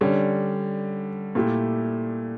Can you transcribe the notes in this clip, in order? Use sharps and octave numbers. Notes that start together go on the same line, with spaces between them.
D3 G3 C#4
A#2 A3 E4 G4